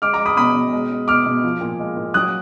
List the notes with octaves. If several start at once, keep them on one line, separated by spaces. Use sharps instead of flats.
G#3 D6 F6
A#5 D6
G#3
B5 D#6
B2 B5 D#6
B2
G#3
G#3
B2 D6 F6
B2
F3
A#2
G#3
A#2
F#3 D#6 F#6